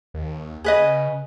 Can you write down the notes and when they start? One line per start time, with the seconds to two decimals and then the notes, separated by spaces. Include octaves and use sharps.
0.14 D#2
0.64 C#3 G#4 B4 D#5